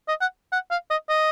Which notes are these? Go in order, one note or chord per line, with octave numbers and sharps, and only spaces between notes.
D#5
F#5
F#5
F5
D#5
D#5